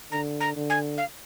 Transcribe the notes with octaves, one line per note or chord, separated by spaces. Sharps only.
D3 A#5
A#5
D3
G#5
F5